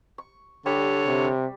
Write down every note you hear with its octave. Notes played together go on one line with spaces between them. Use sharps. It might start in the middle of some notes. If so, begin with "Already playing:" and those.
C#6
D3 G3 C#5
C3